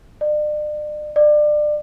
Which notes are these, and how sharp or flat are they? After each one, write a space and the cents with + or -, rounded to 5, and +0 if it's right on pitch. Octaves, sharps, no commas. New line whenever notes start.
D5 +40
D5 +30